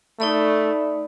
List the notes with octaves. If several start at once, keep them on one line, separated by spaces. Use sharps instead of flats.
A3 D#4 D5 B5